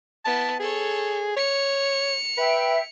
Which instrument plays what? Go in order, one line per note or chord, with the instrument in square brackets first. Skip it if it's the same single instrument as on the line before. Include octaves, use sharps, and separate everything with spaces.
[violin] B3 E4 [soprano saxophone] A5
[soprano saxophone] G#4 [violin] A4 C#5
[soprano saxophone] C#5 [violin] C#7 F7
[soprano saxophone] B4 [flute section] E5 G5